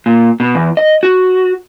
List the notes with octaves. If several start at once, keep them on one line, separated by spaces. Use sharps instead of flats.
A#2
B2
E2
D#5
F#4